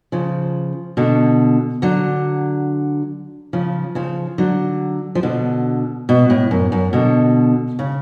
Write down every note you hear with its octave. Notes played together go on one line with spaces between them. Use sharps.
C#3 F3
B2 D3
D3 F#3
C#3 F3
C#3 F3
D3 F#3
F3
B2 D3
B2
A2
F#2
F#2
B2 D3
C#3